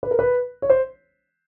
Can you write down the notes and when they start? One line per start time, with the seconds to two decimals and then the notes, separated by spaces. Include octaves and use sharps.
0.03 B4
0.11 A#4
0.19 B4
0.62 C#5
0.70 C5